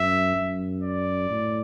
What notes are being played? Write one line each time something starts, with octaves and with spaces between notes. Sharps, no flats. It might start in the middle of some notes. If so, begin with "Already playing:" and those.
Already playing: F#2 E5
F#2
D5
A2